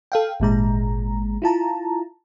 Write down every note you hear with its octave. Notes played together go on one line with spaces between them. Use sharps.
A4 F5 G5
G#1 A#2 G#3 A#5
E4 F4 A5 A#5